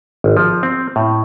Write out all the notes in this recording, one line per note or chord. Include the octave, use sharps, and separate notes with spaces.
G#1
F3
C4
A2